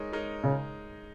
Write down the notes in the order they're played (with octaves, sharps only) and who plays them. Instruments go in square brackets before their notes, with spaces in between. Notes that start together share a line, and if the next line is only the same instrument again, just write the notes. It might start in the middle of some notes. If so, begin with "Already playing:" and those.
Already playing: [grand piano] G#3 D#4 A#4 C#5
G#3 D#4 A#4 C#5
[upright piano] C#3